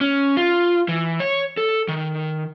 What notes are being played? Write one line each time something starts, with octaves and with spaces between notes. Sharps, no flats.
C#4
F4
E3
C#5
A4
D#3